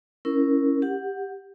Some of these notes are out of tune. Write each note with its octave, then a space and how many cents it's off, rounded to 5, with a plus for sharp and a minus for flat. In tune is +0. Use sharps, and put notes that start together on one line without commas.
C#4 +0 E4 +0 A#4 +0
G4 +10 F#5 -5